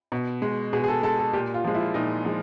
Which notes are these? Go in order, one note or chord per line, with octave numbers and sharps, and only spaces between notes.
B2
G#3
B2 G#4
G#4
A4
G#3 A4
A4
A#2 G4
F4
F3 G#3
E4
A#2 D#4
F3 G#3